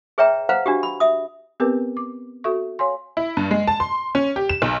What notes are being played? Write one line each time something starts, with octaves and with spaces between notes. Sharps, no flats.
G#4 B4 C#5 E5 G5 A#5
B4 C5 F5 F#5 A#5
D4 F#4 G4
B5
E5 D#6
B3 C4 G4 A#4 B4 D6
D6
F#4 A4 E5 C#6
C#5 F5 G#5 C6
E4
G2
G#3
A5
C6
C#4
G4
E7
B1